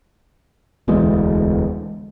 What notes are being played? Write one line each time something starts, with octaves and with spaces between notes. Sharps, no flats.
E1 D2 E3 G#3